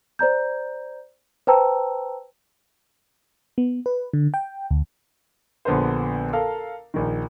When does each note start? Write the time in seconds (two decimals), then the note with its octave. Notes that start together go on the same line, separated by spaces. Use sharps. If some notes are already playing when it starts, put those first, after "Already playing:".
0.19 C5 D5 A#5 G6
1.47 B4 C5 G5 A5 A#5 E6
3.58 B3
3.86 B4
4.13 D3
4.34 G5
4.71 D2
5.65 A#1 D3 B3 B4 C5
6.33 A4 A#4 F5
6.94 A#1 D#3